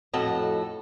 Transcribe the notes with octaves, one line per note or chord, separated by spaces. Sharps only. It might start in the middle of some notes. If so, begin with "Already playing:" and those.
F2 A2 F#4 A4 D#5